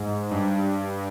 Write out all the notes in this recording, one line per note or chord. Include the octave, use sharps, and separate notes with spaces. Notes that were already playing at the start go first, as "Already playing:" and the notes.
Already playing: G#2
G2